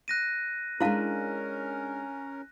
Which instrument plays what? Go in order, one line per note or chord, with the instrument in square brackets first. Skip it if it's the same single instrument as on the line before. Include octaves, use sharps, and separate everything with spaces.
[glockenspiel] F#6 A#6 D#7
[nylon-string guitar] G#3 D4 [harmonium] C#4 A#4 [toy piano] E4 F5 A5